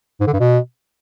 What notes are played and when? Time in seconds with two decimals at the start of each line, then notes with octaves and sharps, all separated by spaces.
0.20 G#2
0.27 D3
0.33 G2
0.39 B2